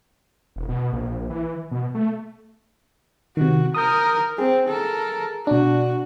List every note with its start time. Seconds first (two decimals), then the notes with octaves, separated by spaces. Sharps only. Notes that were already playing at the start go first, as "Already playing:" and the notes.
0.56 E1
0.69 B2
0.93 A#1
1.30 E3
1.71 B2
1.95 A3
3.37 C3 D#3 F#4
3.75 A#4 D#6 G6
4.38 C4 G#4
4.68 A4 A#4
5.47 B2 D4 F#4